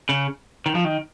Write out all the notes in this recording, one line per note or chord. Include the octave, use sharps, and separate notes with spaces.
C#3
D#3
F3
D#3